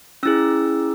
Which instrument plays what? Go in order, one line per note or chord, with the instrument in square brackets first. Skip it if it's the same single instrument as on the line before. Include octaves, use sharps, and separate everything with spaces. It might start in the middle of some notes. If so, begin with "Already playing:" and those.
[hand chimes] C#4 E4 G#4 E6